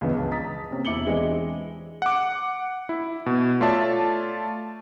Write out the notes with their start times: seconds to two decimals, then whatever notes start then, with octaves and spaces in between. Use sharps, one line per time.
0.01 C#2 G2 E3 F3 B3
0.13 C#2 A5
0.31 A#5 D#6 A6 B6
0.71 C3 A#3 C4 C#4
0.85 E1 E4 D6 C#7 F#7 G7
1.06 E3 G#3 C4 D4
2.02 F#5 D6
2.89 E4
3.26 B2
3.60 A3 F4 C#5 D5 E5 A5